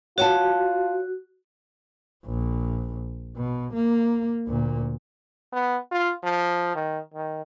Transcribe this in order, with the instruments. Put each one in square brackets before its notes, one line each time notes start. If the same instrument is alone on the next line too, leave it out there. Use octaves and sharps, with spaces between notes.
[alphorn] F4 [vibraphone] F#4 [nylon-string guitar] C#5 F#5 A5
[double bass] A#1
B2
A#3
D2 A#2
[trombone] B3
F4
F3
D#3
D#3